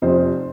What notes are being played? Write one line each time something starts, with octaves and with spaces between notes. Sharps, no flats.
F1 F2 C3 F3 C5